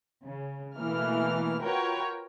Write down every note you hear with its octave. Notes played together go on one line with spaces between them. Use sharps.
C#3
B2 E3 A3 A#3 F6
F4 F#4 A#4 B4 C#5 G5